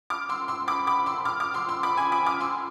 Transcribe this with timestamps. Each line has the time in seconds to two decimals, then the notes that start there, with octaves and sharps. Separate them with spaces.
0.10 D6 F6
0.29 C6 E6
0.48 C6 E6
0.67 B5 D6
0.87 B5 D6
1.06 C6 E6
1.25 D6 F6
1.40 D6 F6
1.54 C6 E6
1.69 C6 E6
1.83 B5 D6
1.97 G#5 B5
2.12 B5 D6
2.26 D6 F6
2.40 C6 E6